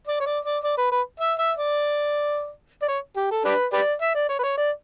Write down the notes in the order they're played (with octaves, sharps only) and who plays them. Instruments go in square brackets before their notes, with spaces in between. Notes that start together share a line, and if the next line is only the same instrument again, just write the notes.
[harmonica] D5
C#5
D5
D5
D5
B4
B4
E5
E5
D5
D5
C#5
G4
A4
D4 G4 B4
G4 B4 D5
E5
D5
C#5
B4
C#5
D5